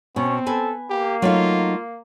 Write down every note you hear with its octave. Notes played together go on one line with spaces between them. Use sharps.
B2 C4 C#4
A4 B4 G#5
A#3 G4
F#3 A3 D#4 F4